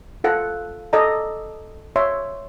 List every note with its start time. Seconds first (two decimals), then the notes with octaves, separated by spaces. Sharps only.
0.24 F4 A4 F#5
0.93 A4 D5 D#5 A#5
1.96 C#5 E5 C6